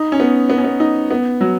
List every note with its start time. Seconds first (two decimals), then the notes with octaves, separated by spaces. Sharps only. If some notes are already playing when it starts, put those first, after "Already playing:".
Already playing: D#4
0.12 C#4
0.20 B3
0.50 B3
0.58 C#4
0.64 B3
0.80 D#4
1.11 B3
1.41 F#3